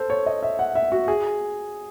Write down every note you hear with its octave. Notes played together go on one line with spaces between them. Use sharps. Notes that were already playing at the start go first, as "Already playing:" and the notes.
Already playing: A4 C5
C#5
D#5
E5
F#5
E5
F#4
G#4